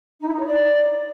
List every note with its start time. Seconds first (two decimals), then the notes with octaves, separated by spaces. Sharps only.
0.20 D#4
0.26 E4
0.33 D#4
0.39 C#5
0.46 D5